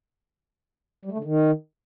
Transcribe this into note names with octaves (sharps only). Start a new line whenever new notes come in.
G3
A3
D3
D#3